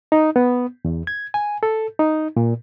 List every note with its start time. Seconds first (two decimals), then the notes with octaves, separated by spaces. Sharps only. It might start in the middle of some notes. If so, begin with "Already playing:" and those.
0.12 D#4
0.36 B3
0.85 E2
1.07 G#6
1.34 G#5
1.63 A4
1.99 D#4
2.37 A#2